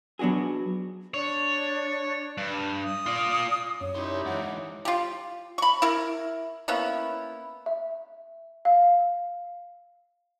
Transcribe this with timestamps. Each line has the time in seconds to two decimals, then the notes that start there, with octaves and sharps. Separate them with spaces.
0.19 F#3 B3 D4 F#4 G#4
1.14 D4 C#5
2.38 G2
2.83 D#6
3.06 F4 D5
3.81 F#2 C#5
3.95 G3 D#4 E4 G4 C6
4.26 G#2 E3 C#5 F#5
4.85 F4 G4
5.58 B5 C#6
5.82 E4 A#4
6.68 A#3 B3 C#4 E4
7.66 E5
8.65 F5